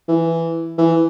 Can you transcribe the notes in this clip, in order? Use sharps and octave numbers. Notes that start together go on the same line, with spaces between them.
E3
E3